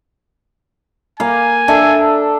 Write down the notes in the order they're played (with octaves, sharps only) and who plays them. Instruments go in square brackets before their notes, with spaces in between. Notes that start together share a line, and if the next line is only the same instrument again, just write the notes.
[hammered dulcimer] A#3 F5 [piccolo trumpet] G#5
[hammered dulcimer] D4 A4 E5